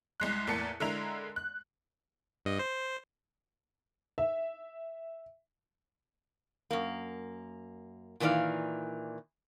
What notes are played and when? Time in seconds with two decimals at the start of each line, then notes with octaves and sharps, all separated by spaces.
0.20 C2 G#3 F#6
0.47 E2 A2 A#3 A5 C#7
0.80 D3 G#3 E4 A#4 F7
1.36 F#6
2.45 G2 D#5
2.59 C5
4.18 E5
6.71 F#2 A#3
8.20 A#2 D#3 E3 A3 D5 F5